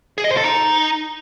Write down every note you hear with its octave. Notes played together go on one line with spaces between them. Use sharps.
G#4
D#5
C5
A4
D#4